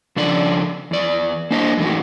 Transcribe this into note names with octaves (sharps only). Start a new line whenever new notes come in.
C#3 F3 D4 D5
E2 D5
A#3 D4 C5 D#5
F#2 A2 E3 D#4 F#4